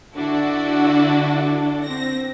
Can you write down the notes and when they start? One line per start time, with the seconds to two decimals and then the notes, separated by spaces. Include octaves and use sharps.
0.16 D3 D4 E4 F#4 A4
1.83 C4 A#6